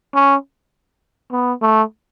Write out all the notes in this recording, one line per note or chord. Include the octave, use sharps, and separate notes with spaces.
C#4
B3
A3